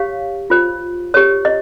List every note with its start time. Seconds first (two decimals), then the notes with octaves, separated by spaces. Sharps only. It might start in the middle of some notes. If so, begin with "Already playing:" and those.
Already playing: G4 C#5 F5
0.50 F4 C5
1.14 G4 C#5
1.45 D#5